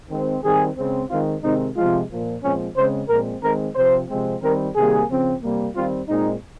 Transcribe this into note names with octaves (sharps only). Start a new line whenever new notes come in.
D#3 G#3 C4
D#3 G3 C4 G#4
C#3 G#3 C4
D#3 G#3 C4 F4
C3 D#3 G#3 C4 D#4
C3 F3 G#3 F4
A#2 F3 A#3
A#2 F3 G#3 C4 C#4
C#3 G#3 C4 C5
A#2 F3 G#3 C4 A#4
D#3 G#3 C4 A#4
C3 F3 C4 C5
C3 F3 G#3 C4
D#3 G3 C4 A#4
C3 D#3 G3 A#3 G#4
C#3 F3 C4
C3 G3 A#3
D#3 G3 C4 F4
A#2 G#3 C4 D#4